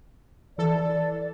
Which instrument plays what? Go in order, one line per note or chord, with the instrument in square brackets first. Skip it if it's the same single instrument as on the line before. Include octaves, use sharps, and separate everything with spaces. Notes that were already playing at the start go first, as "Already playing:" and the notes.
[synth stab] E3 A4 [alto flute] D5